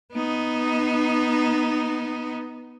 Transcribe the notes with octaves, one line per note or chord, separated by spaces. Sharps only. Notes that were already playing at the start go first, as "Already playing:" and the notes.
B3 D#4